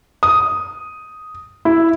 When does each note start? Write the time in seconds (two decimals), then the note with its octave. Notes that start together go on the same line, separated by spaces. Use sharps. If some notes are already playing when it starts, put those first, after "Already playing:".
0.23 D#6
1.65 E4